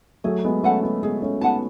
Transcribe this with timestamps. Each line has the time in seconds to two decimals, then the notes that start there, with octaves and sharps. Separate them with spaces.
0.24 F#3 A3 G#4
0.44 G#3 B3
0.63 A3 C#4 B4 F#5 A5
0.83 G#3 B3
1.03 G#3 B3 G#4
1.22 A3 C#4
1.41 B3 D#4 B4 F#5 A5